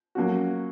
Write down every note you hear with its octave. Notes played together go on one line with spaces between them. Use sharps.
F#3 A#3 C#4 F#4